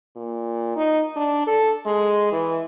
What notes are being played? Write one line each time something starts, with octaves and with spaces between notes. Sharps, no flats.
A#2
D#4
D4
A4
G#3
E3